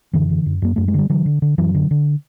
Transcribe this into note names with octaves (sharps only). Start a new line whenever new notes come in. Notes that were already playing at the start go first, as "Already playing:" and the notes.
F#2 D3 E3
D3
F#2
F#2 A#3
F#2 A3
G#3
D3 G3
D3 E3 F#3
D3
D3
F#2 E3 F#3
D3
D3